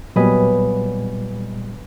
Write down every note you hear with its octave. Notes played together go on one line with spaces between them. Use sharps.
A#2 F#3 G3 B3 B4 D#5 G#5